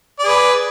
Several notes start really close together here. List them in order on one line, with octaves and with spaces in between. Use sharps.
D5 G#4 B4